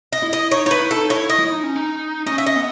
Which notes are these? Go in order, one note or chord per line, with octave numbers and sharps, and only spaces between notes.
D#5
E4
D#5
D#4 C#5
D#4 B4 C#5
E4
A4
D#4
E4 C#5
D#5
E4
D#4
C#4
D#4
C#4 D#5
E5
D#5
B3